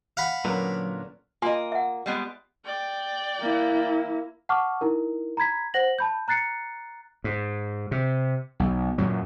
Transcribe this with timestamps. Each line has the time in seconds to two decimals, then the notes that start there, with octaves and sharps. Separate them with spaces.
0.17 F5 F#5 B5
0.45 A#2 D3 F#3 C#4 A#4 B4
1.42 A#3 F4 D#5 G#5 C6
1.72 E5 F#5
2.06 G3 G#3 B3
2.66 D5 G5
3.40 A#3 E4
4.49 F#5 A5 C#6 D6 F6
4.81 D#4 E4 A#4
5.37 A#5 B5 G#6 B6
5.74 C5 F#5 A#6 F#7
5.98 A5 B5 G6
6.28 A#5 F#6 A6 C7 C#7
7.24 G#2
7.91 C3
8.60 B1
8.98 F#2 A#2 F#3